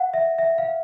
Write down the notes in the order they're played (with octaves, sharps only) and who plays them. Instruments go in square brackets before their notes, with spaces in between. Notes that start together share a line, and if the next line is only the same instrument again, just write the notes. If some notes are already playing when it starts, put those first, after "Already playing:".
Already playing: [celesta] F5 F#5
E5
E5
F5